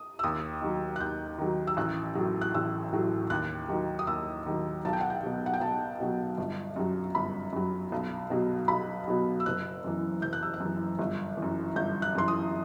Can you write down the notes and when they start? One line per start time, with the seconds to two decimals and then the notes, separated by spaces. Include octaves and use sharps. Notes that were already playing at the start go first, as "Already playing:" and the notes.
Already playing: D#6
0.19 E6
0.23 D#2 D#6
0.61 D#3 F#3
0.96 F#6
1.00 D#2 G6
1.38 D#3 F#3
1.67 E6
1.77 A1 F#6
2.15 A2 F#3
2.41 F#6
2.54 A1 E6
2.92 A2 F#3
3.30 D#2 F#6
3.69 D#3 F#3
3.99 D#6
4.07 D#2 E6
4.46 D#3 F#3
4.85 B1 A5
4.93 G5
5.01 F#5
5.10 G5
5.23 B2 F#3
5.46 F#5
5.54 G5
5.61 B1 A5
6.00 B2 F#3
6.38 G1
6.76 F#2 F#3
7.15 G1 B5
7.53 F#2 F#3
7.92 B1
8.30 B2 F#3
8.68 B1 B5
9.08 B2 F#3
9.40 E6
9.46 F#1 F#6
9.84 F#2 E3
10.22 F#1 G6
10.33 F#6
10.43 E6
10.54 F#6
10.60 F#2
10.65 E3
10.99 G1
11.37 E3
11.42 F#2
11.75 G1 G6
12.02 F#6
12.15 F#2 E3 C6
12.28 D#6